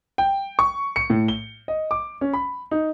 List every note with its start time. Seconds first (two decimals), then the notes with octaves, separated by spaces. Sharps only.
0.18 G5
0.59 C#6
0.96 C#7
1.10 A2
1.28 G7
1.68 D#5
1.91 D6
2.21 C#4
2.33 B5
2.71 D#4